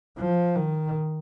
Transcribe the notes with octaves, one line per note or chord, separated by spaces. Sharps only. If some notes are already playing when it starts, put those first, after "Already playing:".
F3
D#3